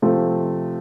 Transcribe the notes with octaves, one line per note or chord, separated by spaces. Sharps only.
C3 F3 A3 C4